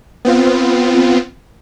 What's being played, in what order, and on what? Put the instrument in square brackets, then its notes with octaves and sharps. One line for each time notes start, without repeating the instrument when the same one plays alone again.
[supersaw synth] B3 C4 F4